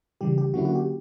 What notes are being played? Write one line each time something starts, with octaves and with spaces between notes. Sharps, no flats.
C#3 E3 G3 G4
G4
D3 F#3 A#3 C#4 E4 F#4
F#4
G4